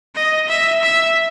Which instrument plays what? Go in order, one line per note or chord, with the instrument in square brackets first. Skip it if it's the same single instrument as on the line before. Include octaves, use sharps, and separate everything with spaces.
[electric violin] D#5
E5
E5